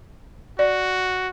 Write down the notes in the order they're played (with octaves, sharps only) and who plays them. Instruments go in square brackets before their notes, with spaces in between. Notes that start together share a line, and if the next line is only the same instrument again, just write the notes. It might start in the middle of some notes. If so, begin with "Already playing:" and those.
[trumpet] F#4 [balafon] D5